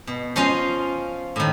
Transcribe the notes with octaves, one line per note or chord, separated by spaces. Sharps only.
B2
F3 C#4 F4 D#5 F5
A2 D#3